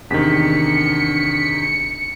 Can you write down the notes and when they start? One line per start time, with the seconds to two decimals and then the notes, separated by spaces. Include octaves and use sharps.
0.10 E2 C3 D#3 D4 B6 C#7